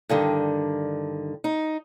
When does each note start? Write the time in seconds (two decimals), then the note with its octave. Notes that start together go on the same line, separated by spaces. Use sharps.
0.09 G2 D3 D#3
1.44 D#4